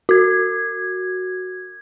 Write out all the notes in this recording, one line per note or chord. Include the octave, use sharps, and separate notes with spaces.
F#4 G#6